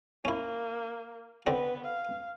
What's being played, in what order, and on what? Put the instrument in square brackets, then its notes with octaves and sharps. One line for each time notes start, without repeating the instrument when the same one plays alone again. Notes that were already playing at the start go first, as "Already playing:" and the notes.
[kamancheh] A#3 [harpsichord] C#4 E4
[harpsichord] D3 C4 D4 [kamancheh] B3 B4
[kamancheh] F5